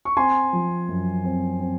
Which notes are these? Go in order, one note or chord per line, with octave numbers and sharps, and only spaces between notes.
C#6
C4 G#5 C6
F3
F#2
C4
C4